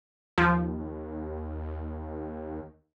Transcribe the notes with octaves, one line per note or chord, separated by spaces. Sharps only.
D#2 F3